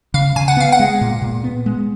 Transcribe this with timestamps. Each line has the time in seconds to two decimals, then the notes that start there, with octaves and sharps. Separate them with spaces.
0.14 C#3 F5
0.36 C#3 G#5
0.48 F#5
0.57 B3 F5
0.72 F#5
0.80 G#3
1.01 A#2
1.22 A#2
1.44 B3
1.66 G#3